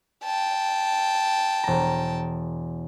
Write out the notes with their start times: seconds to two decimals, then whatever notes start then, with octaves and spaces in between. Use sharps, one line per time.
0.23 G5 A5
1.64 E1 A#5